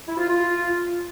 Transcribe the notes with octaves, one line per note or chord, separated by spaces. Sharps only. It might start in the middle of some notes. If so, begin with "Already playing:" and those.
E4
F4
F4